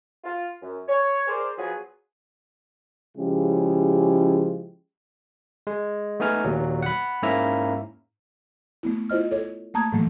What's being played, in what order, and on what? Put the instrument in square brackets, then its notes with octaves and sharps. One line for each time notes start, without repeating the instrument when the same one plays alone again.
[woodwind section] F4
F#2
C#5
G#4 A#4 C5 D5
F3 F#3 B3 G#4
[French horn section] C#3 F3 G#3 C#4 E4 G4
[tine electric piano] G#3
A3 B3 D#4 G#5 F6
D#2 A#2 F#3
F#5 B5
G#2 A#3 C#4 E4 E5 A#5
[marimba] A3 B3 E4
E4 F4 C5 D#5 F6
A4 C#5
A3 A#3 A5 A#5 D#6 G#6
A2 E3 F#3 A3 A#3